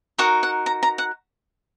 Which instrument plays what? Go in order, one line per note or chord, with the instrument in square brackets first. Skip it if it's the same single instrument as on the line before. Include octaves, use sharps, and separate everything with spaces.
[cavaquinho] D#4 F#4 A#4 F#5
F#5
A#5
A#5
F#5